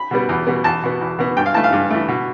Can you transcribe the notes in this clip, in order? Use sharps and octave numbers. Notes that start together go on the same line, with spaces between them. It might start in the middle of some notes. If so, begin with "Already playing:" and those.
Already playing: B5
B2 G3 B3
E2
B2 G3 B3
E2 A5
B2 B3
E2
B2 B3
G2 G5
F5
E3 A3 A5
F5
G2
E3 A3
B2